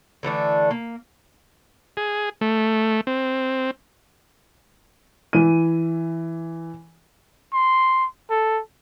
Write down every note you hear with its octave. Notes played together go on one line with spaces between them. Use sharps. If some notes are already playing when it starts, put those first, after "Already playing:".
D3 E3 A3 D4
A#3
G#4
A3
C4
E3 D#7
C6
A4